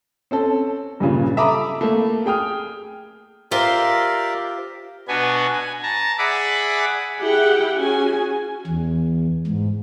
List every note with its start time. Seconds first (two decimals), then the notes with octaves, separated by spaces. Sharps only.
0.31 C4 C#4 A4
1.00 G2 A#2 C#3
1.37 A4 E5 A#5 B5 D6 D#6
1.81 A3 A#3
2.26 G#4 G5 D#6 F6
3.51 F4 G4 A#4 C5 D5 E5
5.08 B2 B3 D4 F#4 B4 G#5
5.53 G#5
5.83 A5 A#5
6.18 G#4 D5 E5 F#5 B5 D6
7.21 E4 G4 G#4 F#5 G5
7.77 C#4 F#4 G#4 G#5
8.67 E2
9.47 G#2